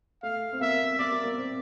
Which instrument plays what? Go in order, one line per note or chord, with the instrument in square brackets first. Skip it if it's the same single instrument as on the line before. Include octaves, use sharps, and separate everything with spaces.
[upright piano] A3 [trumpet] F5
[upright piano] C4
[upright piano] A#3 [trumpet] E5
[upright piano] A#3 [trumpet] D5
[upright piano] A#3
A#3
C4